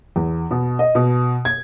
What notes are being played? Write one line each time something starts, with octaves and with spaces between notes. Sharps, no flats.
E2
B2
D#5
B2
G#6